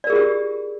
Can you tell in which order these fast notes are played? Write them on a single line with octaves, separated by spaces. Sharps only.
D5 A#4 G#4 F4 G4